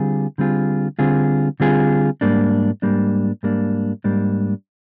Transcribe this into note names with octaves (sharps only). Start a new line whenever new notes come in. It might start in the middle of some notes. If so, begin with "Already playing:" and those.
Already playing: D3 G3 C4 F4 G#4
D3 G3 C4 F4 G#4
D3 G3 C4 F4 G#4
D3 G3 C4 F4 G#4
G#2 G3 A#3 D4
G#2 G3 A#3 D4
G#2 G3 A#3 D4
G#2 G3 A#3 D4